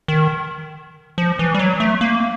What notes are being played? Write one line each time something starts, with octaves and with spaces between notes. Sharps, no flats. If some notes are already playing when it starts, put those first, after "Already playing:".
D#3
F3
E3
G3
F#3
A3
A#3